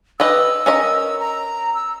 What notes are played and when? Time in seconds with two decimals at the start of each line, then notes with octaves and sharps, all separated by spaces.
0.20 G4 B4 D#5 E6
0.66 C#4 A#4 D#5
1.20 A#5
1.75 E6